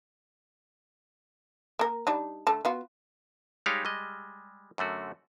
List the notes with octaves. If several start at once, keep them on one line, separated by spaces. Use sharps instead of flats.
A#3 A#4
G3 D4 D#4
D3 A3 A5
B3 F4 F#4
G3 G#3 D#4 G4 C#5 F5
G3 G#3 D#5
F#2 D3 A3 F#4